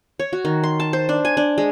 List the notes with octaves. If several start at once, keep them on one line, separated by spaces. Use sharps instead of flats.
C#5
F#4
D#3
C6
A5
C5
D4
G#5
D4
G#3